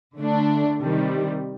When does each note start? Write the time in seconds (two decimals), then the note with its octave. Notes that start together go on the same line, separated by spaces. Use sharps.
0.17 D3 A3 D4
0.78 C3 D#3 G3